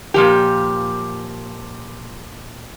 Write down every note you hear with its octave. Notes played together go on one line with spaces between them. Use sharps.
A#2 F3 G4